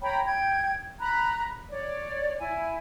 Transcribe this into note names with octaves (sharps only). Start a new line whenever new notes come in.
C#5 G5 A#5 B5
G5 G#6
A#5 B5 F#6
C#5 D5
E4 G#5